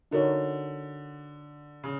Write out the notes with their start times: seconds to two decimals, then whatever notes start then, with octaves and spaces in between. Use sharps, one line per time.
0.11 D3 D#4 F#4 A#4 C#5
1.84 C#3